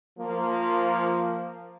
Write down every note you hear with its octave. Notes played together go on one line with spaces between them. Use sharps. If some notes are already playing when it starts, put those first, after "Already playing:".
F3 A#3